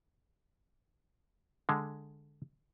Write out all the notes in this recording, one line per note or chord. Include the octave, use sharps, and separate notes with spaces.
D3 G#3